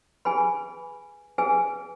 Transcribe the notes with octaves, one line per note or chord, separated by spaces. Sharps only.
G#4 B4 G#5 B5
G#4 B4 G#5